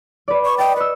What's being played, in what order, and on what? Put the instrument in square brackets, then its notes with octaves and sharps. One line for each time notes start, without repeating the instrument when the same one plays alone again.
[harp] B4 D5
[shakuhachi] C#6
[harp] D#5 A6 [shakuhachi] G5
[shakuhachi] B4 [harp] E6 C#7